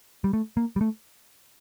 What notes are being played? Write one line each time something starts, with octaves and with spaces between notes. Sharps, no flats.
G3
A3
A#3
G3
A3